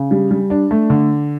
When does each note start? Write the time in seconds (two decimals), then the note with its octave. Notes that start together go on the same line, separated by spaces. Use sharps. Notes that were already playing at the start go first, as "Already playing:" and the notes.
Already playing: C#3
0.11 G3
0.31 G3
0.50 D4
0.71 A3
0.90 D3